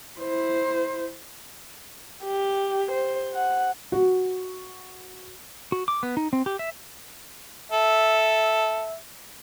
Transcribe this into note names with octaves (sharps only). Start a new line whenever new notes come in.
E4 C5
G4
C5
F#5
F#4
F#4
D6
B3
D#4
C4
G4
E5
A4 E5